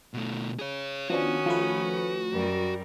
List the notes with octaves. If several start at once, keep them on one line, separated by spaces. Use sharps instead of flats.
B2 A3
G#4 C#5
D#3 F3 B3 C#4 D4 F#4 D#6
F3 A3 B4
F#2 G3 A#4